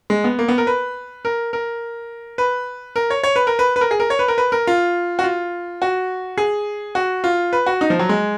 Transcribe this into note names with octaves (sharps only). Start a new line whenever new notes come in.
G#3
B3
A#3
B3
A#4
B4
A#4
A#4
B4
A#4
C#5
C#5
B4
A#4
B4
B4
A#4
G#4
A#4
C#5
B4
A#4
B4
A#4
F4
F#4
F4
F#4
G#4
F#4
F4
B4
F#4
D#4
F3
F#3
G#3